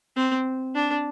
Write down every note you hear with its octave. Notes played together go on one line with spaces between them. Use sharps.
C4
D4